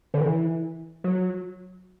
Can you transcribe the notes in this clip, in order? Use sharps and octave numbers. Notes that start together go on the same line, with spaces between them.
D3
E3
F#3